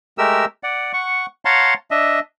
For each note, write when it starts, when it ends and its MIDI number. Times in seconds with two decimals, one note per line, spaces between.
0.18 0.45 56
0.18 0.45 57
0.18 0.45 67
0.18 0.45 70
0.18 0.45 88
0.63 0.92 74
0.63 0.92 78
0.93 1.26 78
0.93 1.26 85
1.45 1.74 73
1.45 1.74 77
1.45 1.74 78
1.45 1.74 81
1.45 1.74 82
1.45 1.74 84
1.91 2.20 62
1.91 2.20 75
1.91 2.20 76